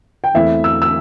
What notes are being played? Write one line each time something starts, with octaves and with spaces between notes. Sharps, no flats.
G5
E2 E3 A3 C4 E4 E5
E6
E6